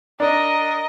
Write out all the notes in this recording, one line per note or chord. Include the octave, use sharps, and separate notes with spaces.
D4 A#4 D#5